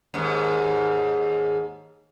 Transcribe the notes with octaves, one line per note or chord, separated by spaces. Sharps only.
D#2 G#2